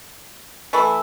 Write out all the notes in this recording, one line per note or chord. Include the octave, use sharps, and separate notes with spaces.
E3 A3 E4